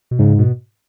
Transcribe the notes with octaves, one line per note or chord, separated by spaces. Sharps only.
B2
G#2 C#3
B2